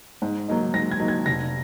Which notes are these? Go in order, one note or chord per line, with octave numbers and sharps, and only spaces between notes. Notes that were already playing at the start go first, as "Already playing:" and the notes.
G#2
F#3 A#3 D#4
G#2 A#6
G#6
F#3 A#3 D#4
G#6
F1 A#6